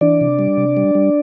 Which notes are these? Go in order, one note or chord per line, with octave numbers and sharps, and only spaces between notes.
E3 D4 D5
C3
G3
C3
G3
G3